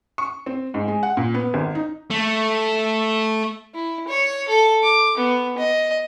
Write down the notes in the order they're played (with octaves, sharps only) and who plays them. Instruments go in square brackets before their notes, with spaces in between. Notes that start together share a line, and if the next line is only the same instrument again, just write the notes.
[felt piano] C#6
C4
G#2
G#3
F#5
A#2
B3
G#1
D#4
[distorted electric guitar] A3
[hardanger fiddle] E4
C#5
A4
D6
B3
D#5